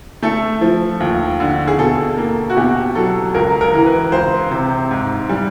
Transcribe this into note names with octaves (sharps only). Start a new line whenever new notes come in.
A3 A4
F3
D#2
D3
G#4
B2 A4
A#3
F#4
B2 G4
F#3 A4
C#2 A#4
A#4
E3
B4
C#2 C5
C3
G#2
G3